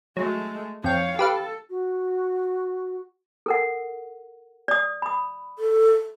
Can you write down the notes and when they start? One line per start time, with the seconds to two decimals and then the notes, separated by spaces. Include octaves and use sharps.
0.17 F#3 G#3 A3
0.84 F2 C#5 F5 G5
1.19 G4 A4 B4 F5
1.70 F#4
3.46 A4 A#4 F#5
4.68 D5 D#6
5.02 B5 D#6
5.59 A4